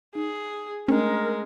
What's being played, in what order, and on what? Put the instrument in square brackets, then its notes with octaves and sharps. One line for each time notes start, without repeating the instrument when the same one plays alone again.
[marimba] D#4 [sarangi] G#4
[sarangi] G#3 [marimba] A3 D4 [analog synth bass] C#4 [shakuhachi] A#4